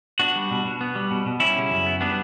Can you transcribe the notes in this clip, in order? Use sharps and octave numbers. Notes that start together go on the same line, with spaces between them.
B3 D4 F#4
G3
B2
B2
B3
G3
B2
B2
G3 C#4 E4
C#3
F#2
B3
G3 B3 D4